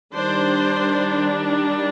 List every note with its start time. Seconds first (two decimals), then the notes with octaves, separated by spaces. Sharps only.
0.14 D#3 G3 D4 C5